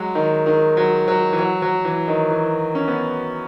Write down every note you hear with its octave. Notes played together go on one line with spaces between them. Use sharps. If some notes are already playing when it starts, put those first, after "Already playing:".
Already playing: F#3 G#3
D#3
D#3
F#3
F#3
E3
F#3
F#3
E3
D#3
E3
C#4
B3